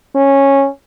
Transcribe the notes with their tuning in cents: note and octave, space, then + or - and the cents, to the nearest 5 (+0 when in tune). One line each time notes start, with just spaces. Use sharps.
C#4 -10